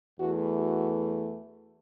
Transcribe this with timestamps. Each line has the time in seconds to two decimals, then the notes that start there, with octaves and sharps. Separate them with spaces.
0.19 E2 E3 A3 F#4
0.57 F#4